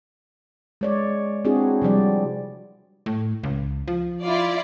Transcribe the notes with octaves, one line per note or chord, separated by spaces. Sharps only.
G#3 C#5 D5
C4 D4 E4 F#4 G#4
C3 F3 G3 D5
A2
C#2
F3
E4 F4 D5